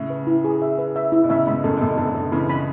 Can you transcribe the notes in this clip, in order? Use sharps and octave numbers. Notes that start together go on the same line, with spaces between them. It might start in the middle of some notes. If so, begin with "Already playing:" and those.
Already playing: A2 C#3 E5
B4
E4
G#4
E5
B4
E5
E4
B2
A2 C#3 E5
G#2 B2 B5
F#2 A2 A4
B2
F#2 A2 A4
B2 D3 A4
A4
C#3 E3 B5
B5